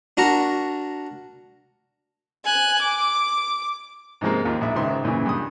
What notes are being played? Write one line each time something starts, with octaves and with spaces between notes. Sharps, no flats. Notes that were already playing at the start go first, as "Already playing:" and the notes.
D4 F#4 A#4 A#5 C#6
G#5 F#6
D6
G#2 C3 F3 G#3 A#3
D#2 F4
A#1 E5
C#2 G#2 D#3 C5 E5 C6
F#2 A#2 C#3 E3
G2 D#6